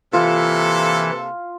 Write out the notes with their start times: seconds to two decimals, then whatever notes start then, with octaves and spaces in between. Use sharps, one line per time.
0.13 C3 E3 A#3 F4 A4